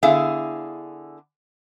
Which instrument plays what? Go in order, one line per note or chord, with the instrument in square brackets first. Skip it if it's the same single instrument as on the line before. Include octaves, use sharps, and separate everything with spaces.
[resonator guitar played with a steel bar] D3 B3 E4 G#4 E5 F5